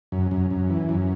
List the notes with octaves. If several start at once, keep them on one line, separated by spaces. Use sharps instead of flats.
F#2
F#2
F#2
E3
F#2